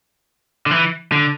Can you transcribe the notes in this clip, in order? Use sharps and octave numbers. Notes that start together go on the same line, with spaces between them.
D3
E3
D3